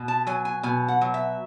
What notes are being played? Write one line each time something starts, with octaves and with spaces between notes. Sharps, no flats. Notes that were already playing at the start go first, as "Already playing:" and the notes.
Already playing: B2
A5
F#3 G#5
G#5
B2 G#5
F#5
F#3
E5